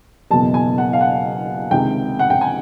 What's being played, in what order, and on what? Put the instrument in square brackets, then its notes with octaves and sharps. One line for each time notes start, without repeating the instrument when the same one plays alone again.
[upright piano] F#1 E2 B2 A5
G#5
F#5
F5
F#5
C#2 C3 D#3 G5
F#5
G5
G#5